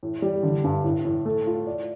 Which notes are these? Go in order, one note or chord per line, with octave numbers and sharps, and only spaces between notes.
A2
G3
D3
G2
A2
A2
A3
F4
D5